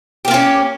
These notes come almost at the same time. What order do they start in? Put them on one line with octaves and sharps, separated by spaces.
G4 A#3 F4 C#4